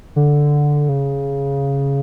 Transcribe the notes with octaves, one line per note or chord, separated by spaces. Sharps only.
D3
C#3